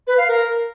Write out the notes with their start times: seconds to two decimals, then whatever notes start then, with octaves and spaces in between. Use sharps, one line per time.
0.07 B4
0.18 F5
0.28 A#4